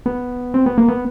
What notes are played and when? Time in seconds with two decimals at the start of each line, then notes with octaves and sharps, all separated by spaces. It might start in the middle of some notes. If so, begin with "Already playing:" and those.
0.06 B3
0.54 C4
0.66 B3
0.78 A#3
0.88 B3